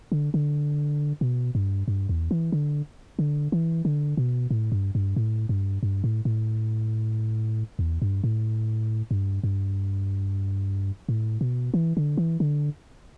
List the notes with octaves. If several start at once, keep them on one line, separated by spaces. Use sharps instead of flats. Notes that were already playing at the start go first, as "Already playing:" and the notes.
D3
D3
B2
G2
G2
E2
E3
D3
D3
E3
D3
B2
A2
G2
G2
A2
G2
G2
A2
A2
E2
G2
A2
G2
G2
A2
B2
E3
D3
E3
D3